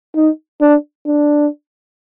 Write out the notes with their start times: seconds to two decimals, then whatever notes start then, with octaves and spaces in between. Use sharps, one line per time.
0.15 D#4
0.61 D4
1.06 D4